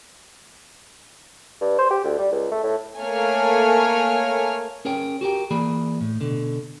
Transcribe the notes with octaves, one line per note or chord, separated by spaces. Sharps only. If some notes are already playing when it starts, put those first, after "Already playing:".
G2
C5
G4
D2
G3
C#2
A3
A2
A3 A#3 C#5 G#5 F6
C#4 G#4 A#4 C#5 G5
F#4 G4 A#4 G5
E3 A#3 G#4 D5 B5
A2
B2 D3